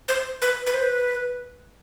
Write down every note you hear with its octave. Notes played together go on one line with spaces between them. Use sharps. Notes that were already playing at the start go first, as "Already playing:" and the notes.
C5
B4
B4
C5
B4